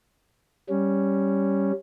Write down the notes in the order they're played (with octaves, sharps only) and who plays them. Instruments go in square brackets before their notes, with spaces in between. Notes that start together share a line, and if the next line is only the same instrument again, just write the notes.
[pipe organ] G3 C#4